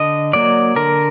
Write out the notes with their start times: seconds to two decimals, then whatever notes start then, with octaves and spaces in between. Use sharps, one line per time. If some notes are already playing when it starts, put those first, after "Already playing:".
Already playing: D3 D#5
0.33 F#3 A#3 D5
0.76 D3 A#4